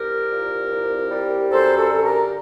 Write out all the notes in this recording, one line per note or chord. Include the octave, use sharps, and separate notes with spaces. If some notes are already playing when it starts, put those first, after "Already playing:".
Already playing: C2 G4 A#4
A#2
C2
G3
F#2 A4 C5
F#4 A4
D3
G4 A#4
A#4